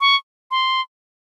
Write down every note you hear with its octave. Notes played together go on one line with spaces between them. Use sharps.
C#6
C6